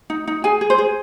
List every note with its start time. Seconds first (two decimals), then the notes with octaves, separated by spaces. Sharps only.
0.10 D#4
0.27 D#4
0.44 G#4 G#5
0.61 G#4
0.70 C5
0.78 G#4